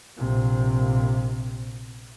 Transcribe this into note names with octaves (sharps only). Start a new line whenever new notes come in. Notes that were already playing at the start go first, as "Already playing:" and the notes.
A#1 C3